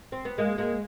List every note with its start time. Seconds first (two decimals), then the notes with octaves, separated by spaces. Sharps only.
0.12 C4
0.25 B3
0.38 G#3 A#3
0.58 G#3 A#3